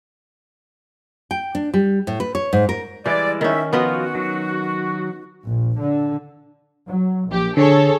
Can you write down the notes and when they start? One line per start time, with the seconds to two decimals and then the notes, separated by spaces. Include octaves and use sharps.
1.31 G5
1.55 D4
1.74 G3
2.07 A2
2.20 B4
2.35 C#5
2.53 G#2
2.69 A#4
3.06 E3 G3 G#3 E4 D5
3.41 D#3 C#4 D#4 E5
3.73 F3 B3 F4 F#4 B4 D#5
4.15 D#3 F#3
5.46 A#1
5.79 D3
6.87 F#3
7.28 A#1 G4
7.57 D3 G#4 A4 C#5